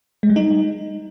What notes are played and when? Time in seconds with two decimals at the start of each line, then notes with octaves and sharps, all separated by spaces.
0.23 G#3
0.30 G3
0.36 D#4